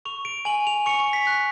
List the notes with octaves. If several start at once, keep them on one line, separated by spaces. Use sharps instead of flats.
C#6 F7
D7
G#5 F#7
F7
C#6 C#7
B6
F#6
B6